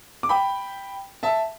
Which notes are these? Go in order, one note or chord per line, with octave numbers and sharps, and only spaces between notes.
D6
G5 B5
E5 A5